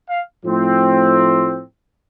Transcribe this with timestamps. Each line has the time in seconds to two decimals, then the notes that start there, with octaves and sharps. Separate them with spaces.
0.08 F5
0.45 A2 F3 A3 C4